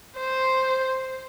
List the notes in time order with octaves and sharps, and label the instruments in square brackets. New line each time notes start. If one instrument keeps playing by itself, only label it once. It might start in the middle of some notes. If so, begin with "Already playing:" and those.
[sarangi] C5